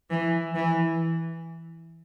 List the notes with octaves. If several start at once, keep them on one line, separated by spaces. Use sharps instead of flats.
E3
E3